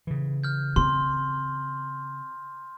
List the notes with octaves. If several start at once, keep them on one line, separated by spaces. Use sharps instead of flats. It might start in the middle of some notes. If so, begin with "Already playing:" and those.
C#3 E3
F6 G6
C4 C6